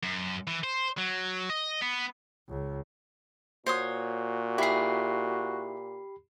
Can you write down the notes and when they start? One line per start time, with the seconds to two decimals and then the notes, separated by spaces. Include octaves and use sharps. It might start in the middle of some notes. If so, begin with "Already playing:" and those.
0.03 F#2
0.47 E3
0.64 C5
0.98 F#3
1.50 D#5
1.82 B3
2.49 C#2
3.66 A#2 F#4 C5 C#5 D#6
4.58 E4 G4 G#4 B5 C7